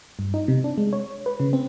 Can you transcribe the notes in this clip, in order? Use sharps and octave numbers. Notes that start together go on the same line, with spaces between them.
G2
D#4
C3
D4
G#3
C#5
B4
C#3
C4